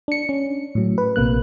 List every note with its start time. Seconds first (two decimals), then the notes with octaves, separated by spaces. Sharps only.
0.08 D4 C#7
0.29 C#4
0.75 A2 F#3
0.98 B4
1.16 A#1 C3 A#3 F#6